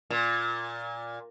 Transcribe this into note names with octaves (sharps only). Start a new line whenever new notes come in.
A#2